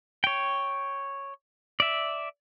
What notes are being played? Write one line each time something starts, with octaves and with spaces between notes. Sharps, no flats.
C#5 G5
D5 E5